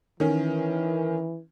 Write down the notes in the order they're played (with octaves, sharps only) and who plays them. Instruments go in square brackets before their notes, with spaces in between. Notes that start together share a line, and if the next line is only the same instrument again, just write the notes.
[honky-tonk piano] D#3 C#4 [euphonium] E3